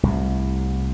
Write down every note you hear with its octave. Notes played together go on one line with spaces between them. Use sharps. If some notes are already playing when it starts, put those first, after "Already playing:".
C2 A2 C3